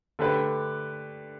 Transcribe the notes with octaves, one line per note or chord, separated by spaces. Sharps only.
D3 A3 G4 B4